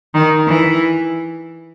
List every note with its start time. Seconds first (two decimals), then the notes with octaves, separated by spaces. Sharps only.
0.15 D#3
0.47 E3